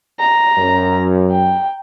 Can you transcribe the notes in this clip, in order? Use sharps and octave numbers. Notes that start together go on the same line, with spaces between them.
A#5
F#2
G5